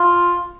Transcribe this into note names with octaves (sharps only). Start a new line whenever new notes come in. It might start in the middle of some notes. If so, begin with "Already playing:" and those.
Already playing: F4